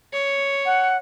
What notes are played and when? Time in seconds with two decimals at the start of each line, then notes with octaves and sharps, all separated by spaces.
0.13 C#5
0.66 F#5